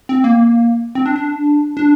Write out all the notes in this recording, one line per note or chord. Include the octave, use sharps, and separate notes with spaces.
C4
A#3
C4
D4
D4
D4